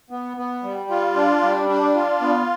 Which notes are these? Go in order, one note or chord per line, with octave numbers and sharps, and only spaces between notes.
B3
B3
G3
F4
D4
G3
D4
F4
B3